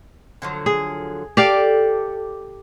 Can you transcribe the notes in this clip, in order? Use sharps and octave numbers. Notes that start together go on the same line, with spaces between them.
D3 F3 F#3
G#4
G4 A4 D5 F5